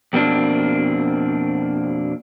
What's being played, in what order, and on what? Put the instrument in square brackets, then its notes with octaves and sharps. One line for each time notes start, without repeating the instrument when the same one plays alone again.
[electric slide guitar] F2 B2 A#3 C4 D4